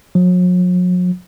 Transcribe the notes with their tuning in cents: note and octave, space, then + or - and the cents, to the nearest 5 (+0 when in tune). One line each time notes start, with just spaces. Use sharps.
F#3 -45